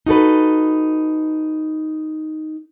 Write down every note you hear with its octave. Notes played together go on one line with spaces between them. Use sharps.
D#4 F#4 A4 B4